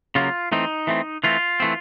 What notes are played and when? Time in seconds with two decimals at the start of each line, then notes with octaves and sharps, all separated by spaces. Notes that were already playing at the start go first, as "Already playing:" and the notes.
0.15 C#3 F#3 A#3 F4
0.52 E3 A3 C4 D#4
0.87 E3 A3 C4
1.24 E3 A3 C4 F4
1.60 E3 A3 C4